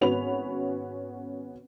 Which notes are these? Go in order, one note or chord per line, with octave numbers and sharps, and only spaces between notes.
G#1 B3 C#4 F#4 B5 F7